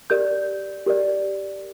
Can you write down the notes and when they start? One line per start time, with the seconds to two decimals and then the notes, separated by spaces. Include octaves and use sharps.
0.10 G4 A#4 D5 G6
0.86 G4 A#4 D5